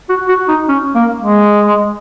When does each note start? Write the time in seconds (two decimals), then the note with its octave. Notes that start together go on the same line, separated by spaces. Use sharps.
0.09 F#4
0.28 F#4
0.48 D#4
0.68 C#4
0.95 A#3
1.21 G#3